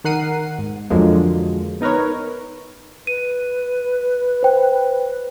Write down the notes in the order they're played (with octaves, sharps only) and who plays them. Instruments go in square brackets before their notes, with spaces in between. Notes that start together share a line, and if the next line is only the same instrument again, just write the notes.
[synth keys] D#3 A#4 F#5 C7 D#7
G#2
F2 D3 F3 F#3 G#3 A#3
B3 D#4 A#4 B4 C#5
[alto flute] B4 [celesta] D#7
[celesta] C5 G5